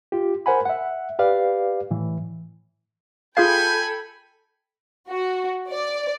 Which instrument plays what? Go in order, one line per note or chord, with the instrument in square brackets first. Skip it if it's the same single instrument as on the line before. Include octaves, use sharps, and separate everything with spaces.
[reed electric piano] F4 G4
A#4 C5 F#5 G#5 B5
E5 F#5
G4 B4 D5 F5
A2 E3
[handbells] F4 G#4 F5 [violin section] A4 G5 B5 [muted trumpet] G#5 [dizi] G6
[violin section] F#4
D5